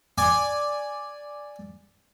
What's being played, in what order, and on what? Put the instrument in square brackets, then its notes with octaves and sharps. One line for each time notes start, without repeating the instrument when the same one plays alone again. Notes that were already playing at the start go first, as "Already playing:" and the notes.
[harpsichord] D5 G#5